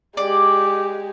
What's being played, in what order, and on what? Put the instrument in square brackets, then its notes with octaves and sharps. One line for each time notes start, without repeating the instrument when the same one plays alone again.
[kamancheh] G#3 G4 [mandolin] D5